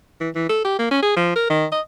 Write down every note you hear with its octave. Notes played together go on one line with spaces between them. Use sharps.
E3
E3
A4
G4
A#3
C#4
G#4
F3
A#4
D#3
D#5